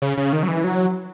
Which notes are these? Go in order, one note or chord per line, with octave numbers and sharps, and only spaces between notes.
C#3
C#3
D#3
F#3
E3
F#3